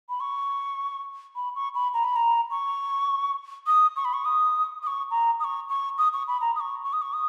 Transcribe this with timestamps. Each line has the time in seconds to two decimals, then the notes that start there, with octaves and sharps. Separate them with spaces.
0.09 B5
0.20 C#6
1.36 B5
1.55 C#6
1.75 B5
1.94 A#5
2.04 B5
2.16 A#5
2.51 C#6
3.67 D#6
3.96 C#6
4.05 B5
4.13 C#6
4.25 D#6
4.83 D#6
4.87 C#6
5.11 A#5
5.40 D#6
5.44 C#6
5.69 C#6
5.98 D#6
6.13 C#6
6.27 B5
6.41 A#5
6.55 D#6
6.60 C#6
6.84 C#6
6.93 D#6
7.02 C#6
7.13 D#6